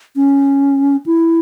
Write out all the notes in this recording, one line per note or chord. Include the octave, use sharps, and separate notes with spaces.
C#4
E4